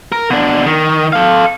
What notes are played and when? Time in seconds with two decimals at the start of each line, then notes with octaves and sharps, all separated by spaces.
0.12 A#4
0.30 B2 D4
0.66 D#3
1.13 A4 F5